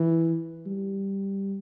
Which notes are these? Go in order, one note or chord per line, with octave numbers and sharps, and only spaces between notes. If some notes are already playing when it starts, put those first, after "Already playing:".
Already playing: E3
G3